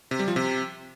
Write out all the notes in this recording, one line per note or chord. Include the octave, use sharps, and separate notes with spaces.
C3
G3
F3
C3